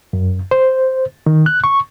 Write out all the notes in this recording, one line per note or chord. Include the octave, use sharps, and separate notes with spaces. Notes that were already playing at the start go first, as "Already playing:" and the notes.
F#2
C5
D#3
F#6
C#6